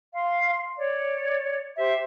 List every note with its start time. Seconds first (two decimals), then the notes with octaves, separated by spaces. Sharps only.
0.14 F5 C6
0.77 C#5 D5
1.77 G4 C5 E5